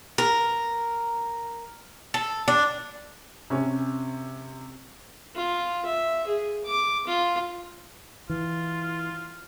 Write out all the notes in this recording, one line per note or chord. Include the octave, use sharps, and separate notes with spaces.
A#4
A4
D4
C3 C#4
F4
E5
G#4
D6
F4
E3 F4